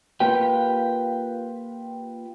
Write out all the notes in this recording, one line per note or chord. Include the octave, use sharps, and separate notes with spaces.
A#3 F4 G4 B4 G5